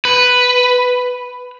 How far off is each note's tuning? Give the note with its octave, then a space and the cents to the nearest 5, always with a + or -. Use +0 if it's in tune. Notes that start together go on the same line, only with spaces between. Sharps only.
B4 +5